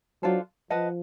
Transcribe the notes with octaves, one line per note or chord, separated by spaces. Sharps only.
F#3 D4 F4 A4 C5
F3 B4 D#5 F#5 A5